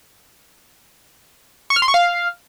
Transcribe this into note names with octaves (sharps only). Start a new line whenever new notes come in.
C#6
F6
C6
C#6
F5